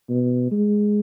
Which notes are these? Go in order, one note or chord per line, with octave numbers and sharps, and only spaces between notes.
B2
G#3